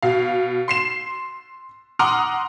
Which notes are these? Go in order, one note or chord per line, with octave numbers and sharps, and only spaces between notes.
B2 F5
C6 C7 E7
F#5 A#5 C6 D6 D#6 F6